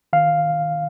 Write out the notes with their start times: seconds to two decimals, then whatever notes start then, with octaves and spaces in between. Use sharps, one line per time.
0.13 D#3 F5